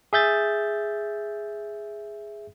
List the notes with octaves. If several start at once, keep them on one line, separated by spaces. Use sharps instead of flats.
G#4 E5 G6 A6